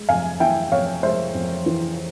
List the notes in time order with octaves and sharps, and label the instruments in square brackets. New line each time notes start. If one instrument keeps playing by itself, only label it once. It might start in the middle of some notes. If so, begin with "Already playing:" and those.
Already playing: [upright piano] G#3
F2 F5 G#5
E3 E5 G5
F2 C#5 F5
G#3 C5 E5
F2
E3